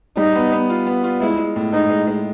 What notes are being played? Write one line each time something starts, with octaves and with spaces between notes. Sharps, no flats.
G3 D#4
B3
B3
F4
B3
F4
G#3 E4
G#3
A2
G#3 D#4
G#3
G#3